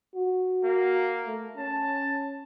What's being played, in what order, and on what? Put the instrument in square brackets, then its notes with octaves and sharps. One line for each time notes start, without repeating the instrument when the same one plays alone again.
[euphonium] F#4
[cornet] A#3
[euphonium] A3
[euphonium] C#4 [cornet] A5